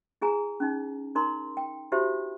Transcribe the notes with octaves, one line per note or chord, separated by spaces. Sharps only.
E4 G#4 G#5 A#5
C#4 D#4
D#4 A#4 A#5 C6
G5
E4 F#4 G4 C5 E5